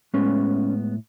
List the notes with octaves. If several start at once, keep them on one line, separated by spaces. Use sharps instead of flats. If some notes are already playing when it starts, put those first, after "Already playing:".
A2 G#3 B3 C#4